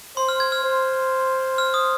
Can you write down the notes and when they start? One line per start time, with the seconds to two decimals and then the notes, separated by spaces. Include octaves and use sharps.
0.17 C5 C6
0.29 F6
0.40 G#6
0.52 F6
0.64 C5
1.58 F6
1.74 D#6